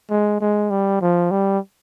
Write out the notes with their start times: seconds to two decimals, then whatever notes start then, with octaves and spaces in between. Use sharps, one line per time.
0.10 G#3
0.41 G#3
0.70 G3
1.01 F3
1.31 G3